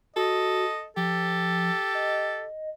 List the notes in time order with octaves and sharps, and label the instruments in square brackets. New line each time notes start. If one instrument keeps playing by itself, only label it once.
[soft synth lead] F#4 [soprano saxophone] A4 [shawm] D#5
[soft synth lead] F3 [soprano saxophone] G4 [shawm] A4
[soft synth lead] D#5